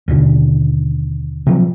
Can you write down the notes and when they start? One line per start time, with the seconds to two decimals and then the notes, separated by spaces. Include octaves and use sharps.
0.08 D#2 B2 D3
1.46 C3 F3 F#3